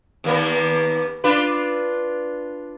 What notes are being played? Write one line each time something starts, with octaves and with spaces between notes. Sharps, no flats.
D#2 A#3 B3
D4 F4 B4